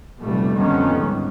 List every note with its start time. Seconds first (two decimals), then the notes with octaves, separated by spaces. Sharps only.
0.19 F1 F2 B2 G3 A3
0.56 F2 D3 D#3 G3 B3 C#4
0.96 C#2 G#2